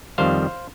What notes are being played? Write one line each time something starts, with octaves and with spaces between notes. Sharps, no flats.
F2 D#3 G3 C5 F5